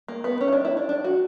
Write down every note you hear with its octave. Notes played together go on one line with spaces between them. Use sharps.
A#3
B3
C#4
E4
D4
E4
D4
D4
F#4